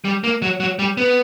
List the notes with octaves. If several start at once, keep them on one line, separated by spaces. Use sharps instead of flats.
G3
A#3
F#3
F#3
G3
B3